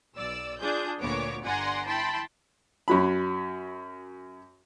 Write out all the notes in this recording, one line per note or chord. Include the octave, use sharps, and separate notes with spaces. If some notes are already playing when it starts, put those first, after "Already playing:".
B1 D5 E6
D4 F4 G#4 G6
D2 A#2 B3 C#5 D6
G1 D5 F#5 G#5 A#5 C6
E4 G5 A5 B5 C6
F#2 F#3 B5